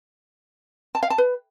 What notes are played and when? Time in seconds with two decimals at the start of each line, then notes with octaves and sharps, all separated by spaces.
0.95 A5
1.03 F5
1.10 A5
1.18 B4